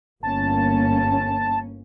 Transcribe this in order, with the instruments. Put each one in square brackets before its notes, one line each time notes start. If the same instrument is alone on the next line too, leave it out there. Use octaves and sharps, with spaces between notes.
[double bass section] G1 A#3 C#4 [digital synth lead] A5